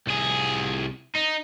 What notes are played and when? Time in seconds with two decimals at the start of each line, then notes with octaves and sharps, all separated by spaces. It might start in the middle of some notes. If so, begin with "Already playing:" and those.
0.07 C2 G#4
1.15 D#4